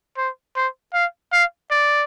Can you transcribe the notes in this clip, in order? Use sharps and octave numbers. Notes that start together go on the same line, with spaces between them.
C5
C5
F5
F5
D5